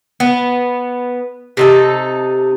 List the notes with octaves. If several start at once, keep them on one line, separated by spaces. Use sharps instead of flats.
B3
C3 D#4 A4